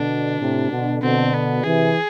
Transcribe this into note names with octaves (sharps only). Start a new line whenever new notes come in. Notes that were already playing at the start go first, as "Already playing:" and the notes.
Already playing: B2 D3 D4
A2 C3
B2 D3
B2 D3 C4
B3
C3 E3 G#4